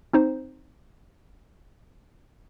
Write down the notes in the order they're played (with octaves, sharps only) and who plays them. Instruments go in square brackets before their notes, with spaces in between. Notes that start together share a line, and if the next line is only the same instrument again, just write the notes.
[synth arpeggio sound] C4 D#4 C5